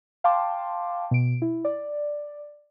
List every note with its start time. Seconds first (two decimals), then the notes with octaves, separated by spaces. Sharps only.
0.24 F5 G5 A5 C6 D6
1.11 B2 D7
1.42 E4
1.65 D5